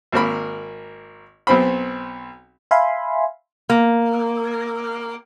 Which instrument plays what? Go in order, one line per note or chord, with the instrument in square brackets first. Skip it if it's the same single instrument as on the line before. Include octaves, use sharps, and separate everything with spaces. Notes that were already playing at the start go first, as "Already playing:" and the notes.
[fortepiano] G#1 A#3 A#4 B5
B1 B2 C4 C5 B5
[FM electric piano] E5 F5 G#5 B5 C6
[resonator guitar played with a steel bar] A#3